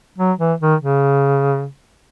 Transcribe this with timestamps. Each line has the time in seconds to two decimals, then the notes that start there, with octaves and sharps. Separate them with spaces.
0.18 F#3
0.39 E3
0.60 D#3
0.80 C#3